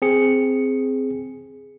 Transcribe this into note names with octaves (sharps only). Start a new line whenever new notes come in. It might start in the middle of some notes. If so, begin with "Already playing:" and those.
C4 G#4 C#7